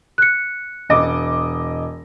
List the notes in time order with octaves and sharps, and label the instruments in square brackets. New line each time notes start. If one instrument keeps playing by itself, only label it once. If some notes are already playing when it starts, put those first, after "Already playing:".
[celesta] F#6 C#7
[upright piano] E1 D#5 D6